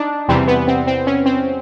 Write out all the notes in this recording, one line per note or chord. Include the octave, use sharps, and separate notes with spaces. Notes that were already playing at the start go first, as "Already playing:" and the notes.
Already playing: D4 D#4
E2 C3 E3 G3 C4
B3
C4
C4
C#4
C4